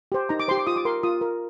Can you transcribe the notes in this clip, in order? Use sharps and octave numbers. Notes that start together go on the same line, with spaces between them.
G4 C5
D#4 A#5
D6
G4 C5 C6
D6
F4 D#6
D6
A#4 C6
F4 D#6
A#4